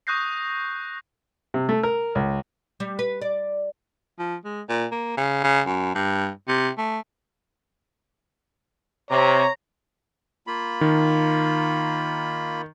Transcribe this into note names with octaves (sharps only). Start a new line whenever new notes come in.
C#6 D#6 F#6 G6 A#6 C7
C3
A3
A#4
C#2
G3
B4
D5
F3
G#3
A#2
A#3
C#3
C#3
F#2
G2
C3
A3
C3 C#5 A#5
A#3 F4 B5
D#3